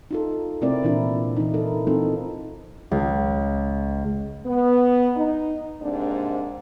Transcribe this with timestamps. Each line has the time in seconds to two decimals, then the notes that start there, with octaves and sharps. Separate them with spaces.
0.11 D#4 F4 A4
0.61 C3 A3 C4 E4 A#4 D5
0.83 A#2 E3 A3 D4 E4 F4
1.37 E3 D#4
1.54 E4 A4 A#4
1.87 E3 C4 D#4 F4 A4
2.91 C#2
4.45 B3
5.16 D#4
5.81 G#2 C3 A#3 C4 D4